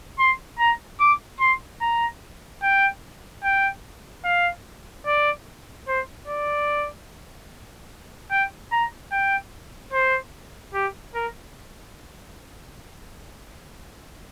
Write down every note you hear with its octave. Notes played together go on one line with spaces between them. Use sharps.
C6
A#5
D6
C6
A#5
G5
G5
F5
D5
C5
D5
G5
A#5
G5
C5
G4
A#4